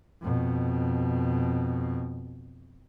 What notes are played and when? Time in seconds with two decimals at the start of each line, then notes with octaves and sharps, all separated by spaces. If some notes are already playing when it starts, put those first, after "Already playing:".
0.22 F2 B2